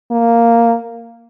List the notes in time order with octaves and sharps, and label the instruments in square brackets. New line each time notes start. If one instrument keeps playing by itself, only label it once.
[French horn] A#3